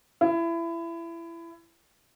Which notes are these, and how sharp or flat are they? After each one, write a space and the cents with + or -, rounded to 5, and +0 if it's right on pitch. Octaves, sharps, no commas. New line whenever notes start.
E4 +25